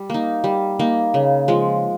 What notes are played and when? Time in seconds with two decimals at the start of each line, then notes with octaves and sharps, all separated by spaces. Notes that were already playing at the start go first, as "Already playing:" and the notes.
Already playing: G3
0.10 A#3 D#4
0.44 G3
0.79 A#3 D#4
1.14 C#3
1.48 F3 G#3